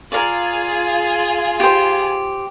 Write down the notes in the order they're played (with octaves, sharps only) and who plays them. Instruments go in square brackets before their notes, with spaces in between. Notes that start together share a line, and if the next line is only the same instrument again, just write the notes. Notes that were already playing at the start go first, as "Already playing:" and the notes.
[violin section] F4 G#4 [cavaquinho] A#4 D5
[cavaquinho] G4 C5